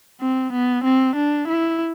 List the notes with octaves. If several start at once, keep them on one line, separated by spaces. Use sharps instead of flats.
C4
B3
C4
D4
E4